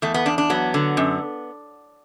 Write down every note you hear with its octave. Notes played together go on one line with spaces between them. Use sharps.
E2 A3
B3
E2 D4
D4
F#3 B3
D3
F#2